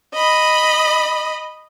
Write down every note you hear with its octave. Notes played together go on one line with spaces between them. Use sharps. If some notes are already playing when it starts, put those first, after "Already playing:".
D#5 B5